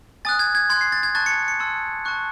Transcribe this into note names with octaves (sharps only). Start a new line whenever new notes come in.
G#5 D#6 F#6 A6
G#6
G#6
C6 F#6 G#6
C7
A6
G#6
A5 C#6 F#6 A6
C#7
C#7
A5 C6 E6
A5 C#6 F#6